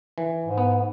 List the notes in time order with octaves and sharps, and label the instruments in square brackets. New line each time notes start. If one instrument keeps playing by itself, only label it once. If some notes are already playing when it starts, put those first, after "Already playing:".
[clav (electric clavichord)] E3
[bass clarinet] G#2
[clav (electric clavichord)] B3